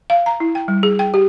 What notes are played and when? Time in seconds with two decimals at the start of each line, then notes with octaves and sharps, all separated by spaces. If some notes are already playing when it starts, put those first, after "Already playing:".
0.10 F5
0.26 A#5
0.40 E4
0.55 G5
0.68 G3
0.83 G#4
0.99 G5
1.14 G4